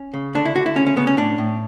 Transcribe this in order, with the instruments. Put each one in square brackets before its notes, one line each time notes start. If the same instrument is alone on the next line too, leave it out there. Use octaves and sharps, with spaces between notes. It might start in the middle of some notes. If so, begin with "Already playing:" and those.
Already playing: [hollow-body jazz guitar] C#4
C#3
D3 D4
E4
D3 F#4
E4
C#3 C#4
C#4
C#3 B3
C#4
A2 D4
A2